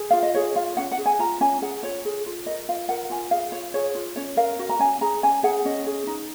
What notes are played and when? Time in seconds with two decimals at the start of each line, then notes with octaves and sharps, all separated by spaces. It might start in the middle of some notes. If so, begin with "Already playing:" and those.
Already playing: G#4
0.11 F4 F5
0.23 D#5
0.34 G#4 C#5
0.56 F4 F5
0.77 C#4 F#5
0.91 F#5
0.98 G#4
1.06 G#5
1.19 F4 A#5
1.41 C#4 G#5
1.62 G#4 F#5
1.83 F4 C#5
2.05 G#4
2.26 F4
2.46 A#4 D#5
2.68 F4 F5
2.89 A#4 F#5
3.10 F4 G#5
3.31 G#4 F5
3.52 F4 C#5
3.74 G#4 C#5
3.95 F4
4.16 C#4 C#5
4.37 A#4 F5
4.59 F#4
4.69 A#5
4.79 C#4 G#5
5.01 G#4 A#5
5.23 C#4 G#5
5.43 G#4 F#5
5.65 C#4 D#5
5.86 G#4
6.07 D#4